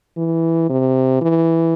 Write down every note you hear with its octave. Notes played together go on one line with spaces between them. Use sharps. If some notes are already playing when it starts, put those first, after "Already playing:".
E3
C3
E3